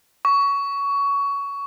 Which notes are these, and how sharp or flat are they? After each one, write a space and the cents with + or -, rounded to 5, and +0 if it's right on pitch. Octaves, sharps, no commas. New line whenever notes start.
C#6 +20